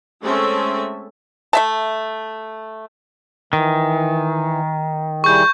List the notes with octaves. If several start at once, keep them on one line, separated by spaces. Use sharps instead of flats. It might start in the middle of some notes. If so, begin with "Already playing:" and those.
G#3 A3 C4 C#4 A4 E5
A3 E5 A5
D#3 E3
G3 E4 G#4 C#6 G6